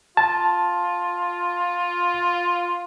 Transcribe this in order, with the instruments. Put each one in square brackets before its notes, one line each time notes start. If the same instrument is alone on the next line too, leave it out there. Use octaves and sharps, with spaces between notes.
[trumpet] F4 [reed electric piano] A5